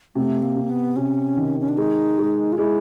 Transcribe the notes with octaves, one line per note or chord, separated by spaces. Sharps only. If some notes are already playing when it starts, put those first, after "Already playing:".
C3 A3
A#3
C3
B3
C3 C#4
D#3
C#4
D4
G#3 D#4
G#3
F4
G#3 E4